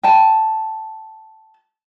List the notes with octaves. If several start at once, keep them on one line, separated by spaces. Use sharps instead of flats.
G5 A5